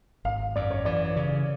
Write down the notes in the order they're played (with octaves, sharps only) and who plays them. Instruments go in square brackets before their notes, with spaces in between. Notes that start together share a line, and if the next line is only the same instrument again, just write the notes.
[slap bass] G#1 [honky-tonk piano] F5
[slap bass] F#2 [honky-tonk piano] D5
[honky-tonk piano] C#5
[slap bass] E3 [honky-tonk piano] D5
[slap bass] C#3